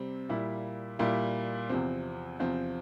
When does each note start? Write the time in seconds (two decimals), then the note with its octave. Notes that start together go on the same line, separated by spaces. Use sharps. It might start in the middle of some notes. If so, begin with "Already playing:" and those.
Already playing: C3 G3 C4
0.29 A#2 G3 A#3 E4
0.99 A#2 G3 A#3 E4
1.69 E2 C3 F3 C4
2.39 E2 C3 F3 C4